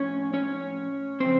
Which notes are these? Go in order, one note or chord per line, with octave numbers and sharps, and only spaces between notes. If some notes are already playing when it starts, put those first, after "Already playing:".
Already playing: A2 F3 C#4 C#5
C#4 C#5
C#3 F3 C4 C5